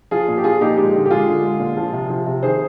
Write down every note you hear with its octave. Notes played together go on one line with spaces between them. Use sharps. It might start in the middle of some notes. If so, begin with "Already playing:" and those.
F3 F4 G#4
A#2
G4
F3 F4 G#4
A#2 D#4 G4
G#3 D#4 G4
D3
G4
G#3 F4 G#4
D3
G#3
A#2
F3
C3
F3
C3
D#3 G#4 C5